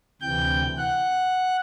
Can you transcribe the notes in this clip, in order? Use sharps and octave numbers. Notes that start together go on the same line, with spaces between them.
D2 C3 E3 G5 G6
F#5 F#6